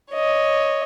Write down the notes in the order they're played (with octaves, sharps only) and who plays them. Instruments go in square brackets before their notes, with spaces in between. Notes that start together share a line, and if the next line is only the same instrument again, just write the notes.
[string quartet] C#5 D#5